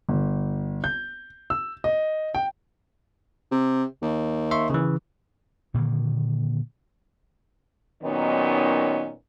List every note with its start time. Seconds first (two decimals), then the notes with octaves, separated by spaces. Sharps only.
0.09 G1
0.84 G6
1.50 E6
1.84 D#5
2.35 G5
3.51 C3
4.02 D#2
4.51 E5 C6 C#6
4.70 C#3 E3
5.74 A#2 D3 D#3 A#3
8.03 A#2 D#3 F#3 B3 C#4 D#4